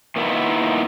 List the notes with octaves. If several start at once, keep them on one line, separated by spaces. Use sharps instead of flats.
A#2 D#3 A#3 B3 D4 E4